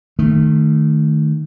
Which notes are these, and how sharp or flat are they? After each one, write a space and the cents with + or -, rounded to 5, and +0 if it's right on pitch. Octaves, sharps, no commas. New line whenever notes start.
D#3 -20 A3 +0